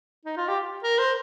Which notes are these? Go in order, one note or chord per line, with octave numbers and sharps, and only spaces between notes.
D#4
F4
G4
A#4
C5